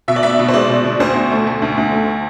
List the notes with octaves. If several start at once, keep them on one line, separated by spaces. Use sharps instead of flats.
B2 E5
D5
B3 E5
B2
C5
G#3 D5
B2
B2
D2 C5
D2
A3
A3
D2
D2
A3